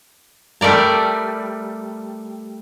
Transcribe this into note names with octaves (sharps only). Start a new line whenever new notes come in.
G3 A3 A#4 D5 A#5